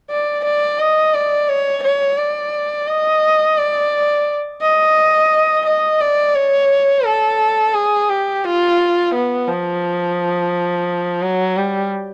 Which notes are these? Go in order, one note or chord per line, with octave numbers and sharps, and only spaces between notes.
D5
D5
D#5
D5
C#5
C#5
D5
D#5
D5
D#5
D#5
D5
C#5
A4
G#4
G4
F4
B3
F3
F#3
G3